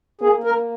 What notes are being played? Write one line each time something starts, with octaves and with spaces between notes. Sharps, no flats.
A#3 G#4
A#4